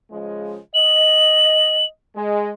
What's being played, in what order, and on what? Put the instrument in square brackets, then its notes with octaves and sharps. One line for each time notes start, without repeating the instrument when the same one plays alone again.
[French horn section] C#3 F3 G#3
[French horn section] D#5 [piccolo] F#7
[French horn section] G#3